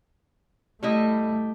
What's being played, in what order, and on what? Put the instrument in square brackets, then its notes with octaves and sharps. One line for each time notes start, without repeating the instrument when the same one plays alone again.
[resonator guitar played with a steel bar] G3 E4 D#5 [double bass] A3